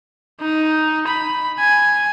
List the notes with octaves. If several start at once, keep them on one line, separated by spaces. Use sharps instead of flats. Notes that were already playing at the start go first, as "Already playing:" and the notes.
D#4
B5
G#5